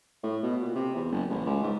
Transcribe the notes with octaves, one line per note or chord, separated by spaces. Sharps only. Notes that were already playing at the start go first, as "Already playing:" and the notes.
A2
B2
A#2
C3
E2
F#1
A1
C#2
G#2